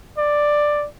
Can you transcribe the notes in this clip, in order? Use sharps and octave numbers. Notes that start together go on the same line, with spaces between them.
D5